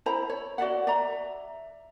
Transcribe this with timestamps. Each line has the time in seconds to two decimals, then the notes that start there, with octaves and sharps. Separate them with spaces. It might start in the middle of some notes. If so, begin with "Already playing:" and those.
0.06 E4 C5 A#5 B5
0.30 C#5
0.58 F#4 D5 E5 F#5
0.87 D5 E5 A#5